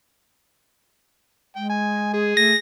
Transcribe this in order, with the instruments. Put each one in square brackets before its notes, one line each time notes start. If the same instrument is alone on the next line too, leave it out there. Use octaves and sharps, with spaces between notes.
[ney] G#3 [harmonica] G5
[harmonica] G#5
G#4
[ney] A3 [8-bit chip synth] A#6